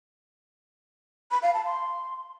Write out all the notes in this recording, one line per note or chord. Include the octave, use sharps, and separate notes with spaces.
B5
F5
A5
C6